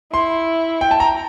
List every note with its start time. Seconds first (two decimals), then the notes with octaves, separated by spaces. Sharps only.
0.13 E4 C6
0.81 G5
0.91 A5
1.00 A#5